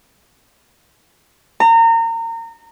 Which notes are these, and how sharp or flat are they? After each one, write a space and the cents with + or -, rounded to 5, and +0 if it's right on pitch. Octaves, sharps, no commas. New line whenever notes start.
A#5 -30